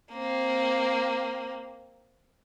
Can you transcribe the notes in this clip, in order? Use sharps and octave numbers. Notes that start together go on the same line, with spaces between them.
A#3 C4